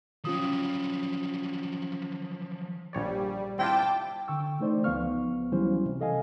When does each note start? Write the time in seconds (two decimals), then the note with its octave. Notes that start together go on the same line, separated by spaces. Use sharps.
0.25 F3 F#3 C#4 F4 D#6
2.93 A#1 G3 C#5 D5
3.59 C4 E4 F4 G5 A5 D6
4.28 D3 G5 C#6 E6
4.60 E3 A3 D#4 C5 D5
4.84 C#2 F3 B3 F5 C#6 F6
5.52 E3 F#3 G3 C#4 E4 C5
5.85 C3
6.01 A4 D#5 F5 G#5